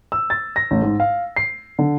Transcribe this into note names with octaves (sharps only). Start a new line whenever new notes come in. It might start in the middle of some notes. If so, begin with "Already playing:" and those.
E6
A6
A#6
A1
G#2
F5
C7
D3